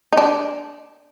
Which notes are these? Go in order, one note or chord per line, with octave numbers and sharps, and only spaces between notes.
D#4
D4